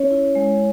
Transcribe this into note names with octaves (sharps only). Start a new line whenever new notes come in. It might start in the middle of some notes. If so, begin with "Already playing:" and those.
Already playing: C#4 C#5
E4
G#3